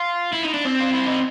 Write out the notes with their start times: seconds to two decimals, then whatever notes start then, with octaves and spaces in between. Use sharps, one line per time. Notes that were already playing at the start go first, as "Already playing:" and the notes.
Already playing: F4
0.33 E4
0.43 D#4
0.54 D4
0.65 C4
0.80 F4
0.93 E4
1.06 D#4